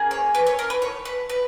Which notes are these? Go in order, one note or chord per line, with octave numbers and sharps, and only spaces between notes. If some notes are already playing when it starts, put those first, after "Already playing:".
Already playing: A#3 C#4 G#4
C#5
B4
C#5
A#4
B4
C#5
B4
B4